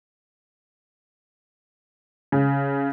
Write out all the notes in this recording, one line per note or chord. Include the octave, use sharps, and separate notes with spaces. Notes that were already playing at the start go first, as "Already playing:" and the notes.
C#3